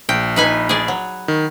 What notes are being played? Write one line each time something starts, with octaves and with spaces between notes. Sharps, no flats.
A#1 G5
D#4 B4 G#5
G#4 D5
F#3
D#3